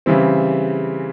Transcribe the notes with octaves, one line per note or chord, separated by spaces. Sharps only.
C#3 E3 G3 C4